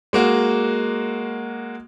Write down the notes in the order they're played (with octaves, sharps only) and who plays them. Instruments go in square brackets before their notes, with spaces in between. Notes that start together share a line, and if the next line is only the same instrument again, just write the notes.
[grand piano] G#3 A#3 F#4